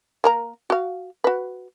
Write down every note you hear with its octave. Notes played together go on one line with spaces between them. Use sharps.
A#3 A#4 A#5
F#4 F5
F#4 B4